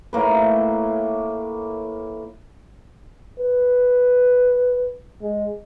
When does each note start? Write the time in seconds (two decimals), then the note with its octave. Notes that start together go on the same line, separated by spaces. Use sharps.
0.13 A2 A#3 B4
3.39 B4
5.22 G#3